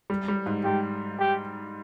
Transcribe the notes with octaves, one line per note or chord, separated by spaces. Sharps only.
G3
G3
G#2
G#2 G4
G4